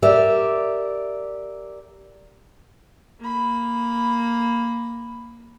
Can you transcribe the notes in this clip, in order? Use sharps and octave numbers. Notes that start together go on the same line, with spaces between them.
G4 A#4 D5 E5
A#3 B5